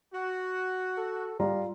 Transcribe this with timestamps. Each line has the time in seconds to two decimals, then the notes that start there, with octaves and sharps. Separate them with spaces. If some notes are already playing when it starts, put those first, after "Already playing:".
0.13 F#4
0.97 A4
1.40 G3 F4 D5 A#5